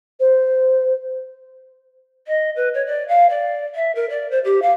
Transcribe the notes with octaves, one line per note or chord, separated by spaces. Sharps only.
C5
D#5
B4
C#5
D5
F5
D5
E5
A#4
D5
C5
G4
F5